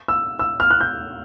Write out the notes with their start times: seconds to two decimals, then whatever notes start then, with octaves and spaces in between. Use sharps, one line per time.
0.08 E6
0.39 E6
0.60 F6
0.70 F#6
0.81 G6